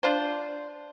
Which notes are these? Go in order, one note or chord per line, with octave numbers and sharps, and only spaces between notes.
D4 F4 C5